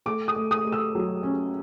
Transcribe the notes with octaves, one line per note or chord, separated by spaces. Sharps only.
A3 D6
D#6
A3
D#6
A3
E6
F#3
C#4